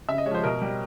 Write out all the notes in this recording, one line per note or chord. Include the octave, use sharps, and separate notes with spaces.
C#3 E5
D#5
G#3 C#5
F3 C5
B2 A#4
G3